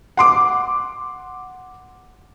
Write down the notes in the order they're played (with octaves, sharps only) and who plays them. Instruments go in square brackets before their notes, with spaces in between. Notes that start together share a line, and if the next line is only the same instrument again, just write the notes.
[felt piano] F#5 C6 D6